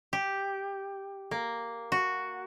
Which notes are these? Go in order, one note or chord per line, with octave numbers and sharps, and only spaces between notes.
G4
A#3
F#4